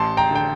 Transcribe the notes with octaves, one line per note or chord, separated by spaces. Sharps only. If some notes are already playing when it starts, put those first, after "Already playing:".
Already playing: A1 A5 C6
G5 A#5
D3 G5